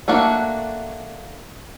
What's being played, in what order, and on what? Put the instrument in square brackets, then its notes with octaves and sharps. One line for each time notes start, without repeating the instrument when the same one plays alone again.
[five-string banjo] A3 A#3 D4 F#4 A4